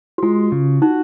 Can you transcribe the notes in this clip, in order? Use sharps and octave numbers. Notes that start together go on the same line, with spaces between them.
F#4
G#3 F4
C#3
D#4 F#4